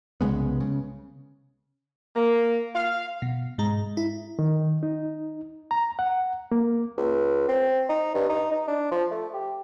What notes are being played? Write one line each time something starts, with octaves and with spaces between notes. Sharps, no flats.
C2 C#3 G#3 B3
C#3
A#3
F5
B2
G#2 G#3 A#5
E4
D#3
D#4
A#5
F#5
A#3
C#2
C4
D#4
G2
D#4
D#4
D4
F3
A3
G4